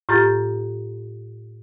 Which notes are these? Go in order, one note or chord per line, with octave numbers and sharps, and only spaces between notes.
A2 F4 G4 A#5 A6